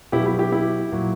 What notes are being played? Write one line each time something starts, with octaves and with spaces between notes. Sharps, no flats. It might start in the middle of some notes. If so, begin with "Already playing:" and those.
B2 F#3 E4 G4
E4 G4
E4 G4
E4 G4
A#2 F#3